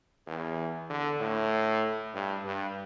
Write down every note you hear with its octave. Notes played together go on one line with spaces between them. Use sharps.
E2
D3
A2
G2
G2